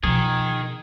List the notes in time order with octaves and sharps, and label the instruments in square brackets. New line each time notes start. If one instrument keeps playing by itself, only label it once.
[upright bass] B2 [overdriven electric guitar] D#3 [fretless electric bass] F3 [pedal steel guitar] G#4